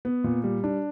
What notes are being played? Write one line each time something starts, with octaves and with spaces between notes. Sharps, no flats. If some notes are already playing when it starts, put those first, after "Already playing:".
B3
A#2
G3
D4